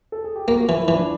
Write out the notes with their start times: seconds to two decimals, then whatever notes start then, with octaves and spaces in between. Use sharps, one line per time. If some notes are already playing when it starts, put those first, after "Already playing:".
0.12 A4
0.24 G#4
0.36 G4
0.48 A#3 F#4
0.59 F#4
0.63 F4
0.69 E3
0.78 E4
0.88 E3
0.94 D4